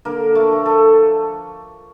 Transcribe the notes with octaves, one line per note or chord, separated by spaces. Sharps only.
D3 A#3 A#4
A3 A4
F3 A3
A3 A4